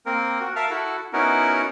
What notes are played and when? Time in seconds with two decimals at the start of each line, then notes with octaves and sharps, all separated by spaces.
0.06 A#3 C4 A#4
0.41 F#4
0.56 A#4 E5 F5 A5 F6
0.70 E4 F#4 A4
1.13 B3 C#4 D#4 E4 F#4 A#4